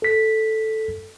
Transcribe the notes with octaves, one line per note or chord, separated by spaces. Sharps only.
A4 B6